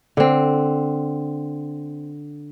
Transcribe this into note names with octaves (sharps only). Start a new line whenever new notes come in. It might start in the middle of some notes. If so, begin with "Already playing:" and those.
D3 C4